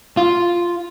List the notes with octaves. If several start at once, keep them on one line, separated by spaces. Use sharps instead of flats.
F4